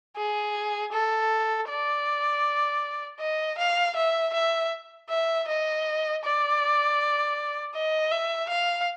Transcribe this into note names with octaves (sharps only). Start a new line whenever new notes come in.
G#4
A4
D5
D#5
F5
E5
E5
E5
D#5
D5
D#5
E5
F5